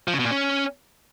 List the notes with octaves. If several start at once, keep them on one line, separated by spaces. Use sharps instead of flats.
F3
C#3
B2
A#2
C#4